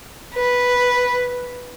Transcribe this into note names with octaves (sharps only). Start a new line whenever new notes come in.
B4